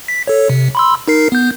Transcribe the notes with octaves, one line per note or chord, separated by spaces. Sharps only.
B6
A4 C#5
C3
B5 C6 E6
D#4 A#4 C7
B3 G6